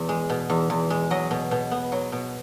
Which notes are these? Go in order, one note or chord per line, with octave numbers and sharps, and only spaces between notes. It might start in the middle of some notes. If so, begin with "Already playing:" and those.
Already playing: E2 B2
G#3
B2
E2
E2
G#3
F#3 D#5
B2
B2
B3
F#3
B2